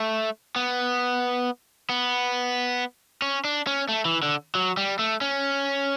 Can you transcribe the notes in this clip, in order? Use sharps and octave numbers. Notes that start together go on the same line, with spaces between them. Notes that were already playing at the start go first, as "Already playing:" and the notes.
Already playing: A3
B3
B3
C#4
D4
C#4
A3
E3
D3
F#3
G3
A3
C#4